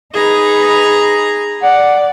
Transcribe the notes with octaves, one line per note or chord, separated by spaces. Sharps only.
D#4 G#4 B4 A#5
D5 F#5